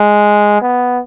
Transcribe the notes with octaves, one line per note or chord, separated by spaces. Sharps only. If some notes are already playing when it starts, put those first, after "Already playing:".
Already playing: G#3
B3